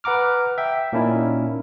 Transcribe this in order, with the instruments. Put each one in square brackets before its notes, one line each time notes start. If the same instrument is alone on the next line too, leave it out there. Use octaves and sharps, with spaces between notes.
[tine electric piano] B4 F#5 A#5 D6 F6
E5 G5
A#2 A#3 C#4 D#4 E4 A5